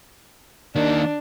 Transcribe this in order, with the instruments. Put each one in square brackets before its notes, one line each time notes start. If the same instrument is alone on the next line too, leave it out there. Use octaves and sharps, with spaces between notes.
[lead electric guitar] D#3 A#3 [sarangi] D4